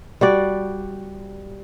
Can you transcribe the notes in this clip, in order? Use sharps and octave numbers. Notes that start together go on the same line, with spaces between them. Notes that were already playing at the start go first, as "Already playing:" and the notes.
G3 F#4 D5